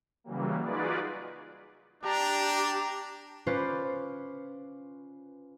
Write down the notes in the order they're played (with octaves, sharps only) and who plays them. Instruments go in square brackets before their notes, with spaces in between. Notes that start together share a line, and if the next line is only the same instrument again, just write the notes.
[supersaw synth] C#3 E3 F#3 G3 A#3
D#4 F4 F#4 G#4 B4 D5
[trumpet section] D4 [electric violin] G4 A#5
[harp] C#4 F4 B4 C5 D5